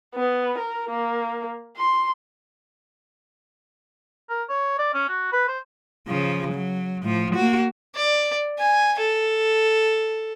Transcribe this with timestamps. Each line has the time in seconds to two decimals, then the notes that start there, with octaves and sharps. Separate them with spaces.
0.15 B3
0.59 A#4
0.90 A#3
1.76 C6
4.29 A#4
4.49 C#5
4.79 D5
4.94 C#4
5.09 F#4
5.32 B4
5.48 C5
6.08 C#3 F3
6.53 F#3
7.03 A2 F3
7.35 A#3 F#4
7.95 D5
8.59 G#5
8.99 A4